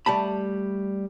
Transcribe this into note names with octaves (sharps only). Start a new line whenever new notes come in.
G3 A3 A5 B5